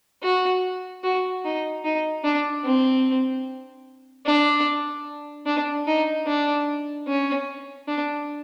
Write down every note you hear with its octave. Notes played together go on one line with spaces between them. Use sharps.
F#4
F#4
D#4
D#4
D4
C4
D4
D4
D#4
D4
C#4
D4